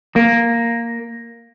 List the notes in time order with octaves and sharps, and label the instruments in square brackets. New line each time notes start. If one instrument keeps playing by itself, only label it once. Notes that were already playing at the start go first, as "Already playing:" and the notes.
[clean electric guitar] A#3